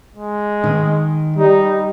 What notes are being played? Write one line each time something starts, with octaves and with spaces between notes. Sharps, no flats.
G#3
D#3
G3 D#4